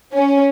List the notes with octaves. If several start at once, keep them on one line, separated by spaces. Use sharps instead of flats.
C#4